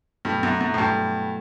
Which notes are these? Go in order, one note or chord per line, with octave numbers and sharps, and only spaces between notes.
G2 B2 F#3 A3 E4 A4
F#2
F#2
A2
G2 B2 F#3 A3 E4 A4